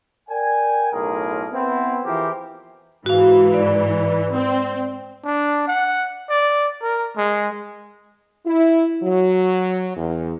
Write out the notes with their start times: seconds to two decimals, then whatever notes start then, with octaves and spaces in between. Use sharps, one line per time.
0.29 A#4 D5 G5 G#5
0.91 B1 A2 G#4 A#4
1.52 B3 C4 E4
2.05 E3 F3 G4 G#4 A#4 C5
3.06 G#2 E3 F#4 F5
3.54 D5
4.33 C4
5.25 D4
5.68 F#5
6.30 D5
6.82 A#4
7.17 G#3
8.46 E4
9.03 F#3
9.97 E2